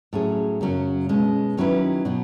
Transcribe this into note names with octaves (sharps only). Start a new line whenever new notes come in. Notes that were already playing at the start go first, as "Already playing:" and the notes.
A2 F#3 C#4 G#4
F#2 C#3 F#3 C#4
B2 G#3 C#4
D#3 F#3 C#4 E4 B4
B2 F#3